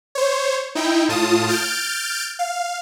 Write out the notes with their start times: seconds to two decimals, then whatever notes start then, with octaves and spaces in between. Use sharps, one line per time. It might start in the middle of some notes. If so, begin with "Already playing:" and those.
0.15 C5 C#5
0.75 D#4 E4 G5
1.09 A2 F4 A5 D#6
1.48 F6 G6 A6 D7
2.39 F5